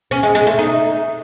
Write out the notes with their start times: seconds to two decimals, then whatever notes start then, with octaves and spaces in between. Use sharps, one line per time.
0.11 C#4
0.23 G#3
0.35 G#3
0.47 A3
0.59 D#4